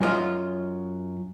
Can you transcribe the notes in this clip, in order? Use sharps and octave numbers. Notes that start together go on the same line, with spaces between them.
F#2 F#3 A#3 F4 D#5